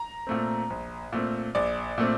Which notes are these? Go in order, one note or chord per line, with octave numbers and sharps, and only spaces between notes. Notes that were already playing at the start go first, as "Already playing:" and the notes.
Already playing: A#5
A#2 A3 C4
A#1
A#2 A3 C4
A#1 D5
A#2 A3 C4